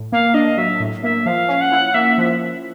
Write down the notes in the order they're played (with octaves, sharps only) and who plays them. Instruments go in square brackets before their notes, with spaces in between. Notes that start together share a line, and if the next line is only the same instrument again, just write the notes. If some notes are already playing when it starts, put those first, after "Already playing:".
Already playing: [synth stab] A2
[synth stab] A#3 [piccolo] F5
[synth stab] D4 [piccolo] D#5
[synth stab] F#3 [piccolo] E5
[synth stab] A2
[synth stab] A#3 [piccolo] E5
[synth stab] F3 [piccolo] F5
[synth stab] C#4
[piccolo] F#5
[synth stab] E4
[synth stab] A#3 [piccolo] E5
[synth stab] F3